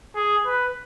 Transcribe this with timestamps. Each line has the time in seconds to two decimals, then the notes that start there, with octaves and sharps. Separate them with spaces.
0.15 G#4
0.45 B4